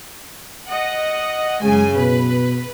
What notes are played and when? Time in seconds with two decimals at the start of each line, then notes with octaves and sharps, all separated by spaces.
0.68 D#5 F#5
1.62 F#2 C#3 G#3 G#5
1.95 B2 B4